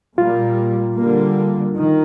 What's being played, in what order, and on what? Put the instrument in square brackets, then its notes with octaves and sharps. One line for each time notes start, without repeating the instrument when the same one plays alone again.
[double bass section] A#2 G3 A#3 [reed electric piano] F4
[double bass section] D3 G3 A#3
D#3